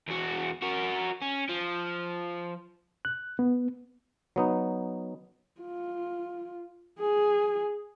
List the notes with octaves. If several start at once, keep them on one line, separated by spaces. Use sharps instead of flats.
E2 F#4
F#4 A#4
C#4
F3
F#6
B3
F#3 B3 D#4
F4
G#4